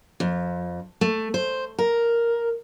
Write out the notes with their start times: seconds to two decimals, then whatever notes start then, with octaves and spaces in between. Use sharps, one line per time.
0.20 F2
1.01 A3
1.34 C5
1.79 A#4